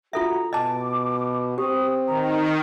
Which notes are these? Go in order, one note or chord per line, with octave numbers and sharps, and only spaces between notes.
F4 F#4 A4 E5 A#5
B2 D#5 A5 D6
C4 G4 D#6
D#3 A#5